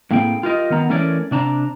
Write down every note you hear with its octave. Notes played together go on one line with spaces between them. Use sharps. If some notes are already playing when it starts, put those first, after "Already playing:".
A2 A#3 C4 G#4 G5
F4 G4 A#4 D#5
D#3 B3 A#5
E3 A3 C#4 A#4 C#5 D5
C3 D4 A5 A#5